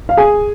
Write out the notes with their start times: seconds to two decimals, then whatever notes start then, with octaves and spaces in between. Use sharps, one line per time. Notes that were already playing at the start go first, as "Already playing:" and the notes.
0.09 F5
0.17 G#4 G#5